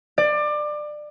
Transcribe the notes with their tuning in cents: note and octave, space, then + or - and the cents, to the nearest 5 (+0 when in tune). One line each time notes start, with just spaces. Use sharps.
D5 +25